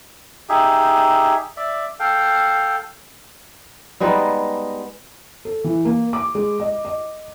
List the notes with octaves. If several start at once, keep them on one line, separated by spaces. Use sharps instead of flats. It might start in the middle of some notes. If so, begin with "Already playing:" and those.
D#4 G4 G#4 E5
D5 E5
A4 F5 G5
G3 G#3 B3 D#4
A4
E3
A#3
D6
G#3
D#5
D#5